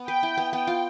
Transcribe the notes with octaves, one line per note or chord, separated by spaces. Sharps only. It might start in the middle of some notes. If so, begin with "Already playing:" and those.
Already playing: B3
B4 G5
E4
B3
B3 G5
F4